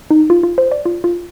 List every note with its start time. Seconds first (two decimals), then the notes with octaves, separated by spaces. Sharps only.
0.11 D#4
0.30 F4
0.43 F4
0.58 C5
0.72 D5
0.85 F4
1.04 F4